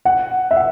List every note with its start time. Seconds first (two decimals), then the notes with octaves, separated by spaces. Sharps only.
0.05 F#5
0.51 E5
0.57 F#5